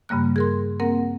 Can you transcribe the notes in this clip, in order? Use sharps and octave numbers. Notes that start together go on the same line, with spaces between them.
G2 C#3 G3 A#3 F#6
G#4 A#4 C6
A#3 C4 A#4 F#5